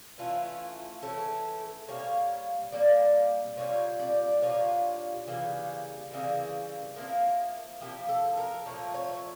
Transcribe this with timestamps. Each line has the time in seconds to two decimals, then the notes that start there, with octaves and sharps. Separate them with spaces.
0.18 E3 A3 C#4 E4 F4
1.02 E3 A3 C#4 E4 A4
1.88 A#2 G3 A#3 C#5
2.72 A#2 G3 A#3 D5
3.57 A#2 G3 D4 F4 C#5
3.99 D5
4.42 A#2 G3 D4 F4 C#5
5.27 C#3 E3 G3 A#3
6.11 C#3 E3 G3 A#3
6.96 F3 A#3 E4 A#4
7.81 F3 A#3 E4 G4
8.09 A4
8.37 A#4
8.66 A#2 F3 A3 C#5
8.94 C#5